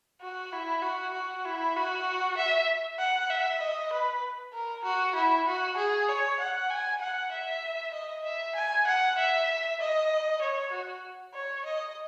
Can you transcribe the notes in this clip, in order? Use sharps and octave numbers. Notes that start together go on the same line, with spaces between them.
F#4
E4
F#4
F#4
E4
F#4
E5
F#5
E5
D#5
B4
A#4
F#4
E4
F#4
G#4
C#5
F#5
G#5
F#5
E5
D#5
E5
G#5
F#5
E5
D#5
C#5
F#4
C#5
D#5